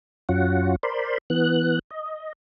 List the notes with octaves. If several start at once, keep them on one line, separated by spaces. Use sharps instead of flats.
F#2 C#4 F4 F#4 F#5
A#4 C5 D5 B5 C6
E3 B3 F#6
D#5